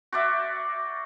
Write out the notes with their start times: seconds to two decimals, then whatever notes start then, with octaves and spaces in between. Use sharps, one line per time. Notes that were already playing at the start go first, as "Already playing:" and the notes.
0.12 F#4 C5 D5 E5